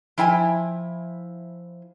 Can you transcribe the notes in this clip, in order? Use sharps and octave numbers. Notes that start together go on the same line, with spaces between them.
F3 E4 G5 G#5